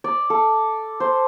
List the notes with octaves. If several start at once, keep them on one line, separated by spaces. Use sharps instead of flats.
D5
A4
C5